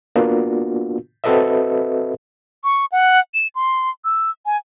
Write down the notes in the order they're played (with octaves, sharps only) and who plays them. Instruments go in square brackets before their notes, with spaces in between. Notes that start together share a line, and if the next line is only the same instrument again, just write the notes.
[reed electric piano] A#3 B3 D4 F4 F#4
C4 F#4 A4 B4 D#5 E5
[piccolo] C#6
F#5
E7
C6
E6
G#5